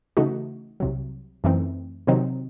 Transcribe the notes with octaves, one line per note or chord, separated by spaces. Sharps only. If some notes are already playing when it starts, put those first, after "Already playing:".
C#3 E3 A3 D#4 F#4
C2 C3 F#3
F#2 E3 A3 C4 D#4
C3 D#3 F#3 C4 D#4